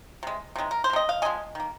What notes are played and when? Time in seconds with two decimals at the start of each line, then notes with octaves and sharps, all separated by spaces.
0.23 C3 G#3
0.56 C3 D#3 G#3
0.71 A#4
0.84 C5
0.90 G#3
0.93 C3 D#5
1.09 F5
1.22 C3 F3 G#3 D#5 G#5
1.55 D#3 A#3